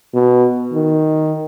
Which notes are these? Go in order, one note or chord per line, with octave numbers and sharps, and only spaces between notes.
B2
D#3